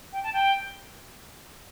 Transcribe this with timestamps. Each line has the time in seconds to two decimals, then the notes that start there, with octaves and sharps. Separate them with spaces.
0.13 G5
0.23 A5
0.33 G5